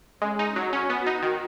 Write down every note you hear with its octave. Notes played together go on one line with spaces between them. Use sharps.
G#3 C#4
D#4
F#3 F#4
C#4
B3 F#4
D#4
D#3